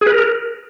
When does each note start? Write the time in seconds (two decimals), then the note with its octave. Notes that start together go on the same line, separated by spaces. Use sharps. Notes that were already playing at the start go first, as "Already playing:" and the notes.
0.01 G#4
0.07 B4
0.12 A#4